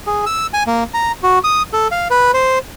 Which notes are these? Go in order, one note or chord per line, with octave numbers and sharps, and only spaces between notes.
G#4
E6
G#5
A#3
A#5
F#4
D#6
A4
F5
B4
C5